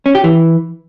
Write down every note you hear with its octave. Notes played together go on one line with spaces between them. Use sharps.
C#4
G4
E3